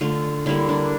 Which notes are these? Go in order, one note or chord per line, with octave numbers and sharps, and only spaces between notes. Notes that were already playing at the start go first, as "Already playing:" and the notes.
D3 A3 F4
D3 G3 A#3 E4
D4